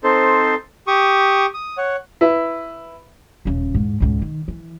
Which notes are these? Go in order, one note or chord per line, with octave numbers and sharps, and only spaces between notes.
C4 D#4 A4 C5
G4 C#6 D#6
D#6
C#5 F#5
E4 B4
D#1 C#3
E2 G#2
C#2 G#2
D#3
E3